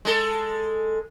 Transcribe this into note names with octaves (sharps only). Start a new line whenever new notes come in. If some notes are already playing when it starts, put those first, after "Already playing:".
G#3 A4